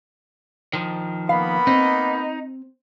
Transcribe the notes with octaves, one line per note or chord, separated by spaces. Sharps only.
D#3 F3
A#3 B3 F5 B5
C4 D#4